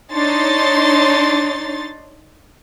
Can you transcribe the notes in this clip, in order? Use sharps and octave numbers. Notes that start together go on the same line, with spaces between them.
D4 D#4 C#5 C6 A6